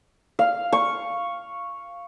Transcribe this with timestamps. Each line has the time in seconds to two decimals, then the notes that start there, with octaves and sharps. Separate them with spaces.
0.39 F5
0.73 C#6